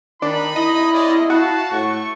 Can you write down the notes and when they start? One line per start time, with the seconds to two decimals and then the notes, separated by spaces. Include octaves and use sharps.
0.22 D#3 D4 D#4 B5
0.56 E4 D#5
0.92 G#3 C#4 D5
1.30 F#4 F5 A5
1.72 A2 A3 C#6